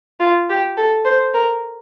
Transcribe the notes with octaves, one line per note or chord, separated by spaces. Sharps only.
F4
G4
A4
C5
A#4